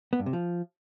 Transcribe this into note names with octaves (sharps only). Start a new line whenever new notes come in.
B3
G2
C3
F3